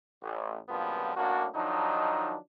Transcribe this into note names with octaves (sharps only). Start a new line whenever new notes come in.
A1
C#2 G2 A#2 F3 F#3 B3
F#2 A2 A#3 D4 F#4
D#3 F3 F#3 D4 D#4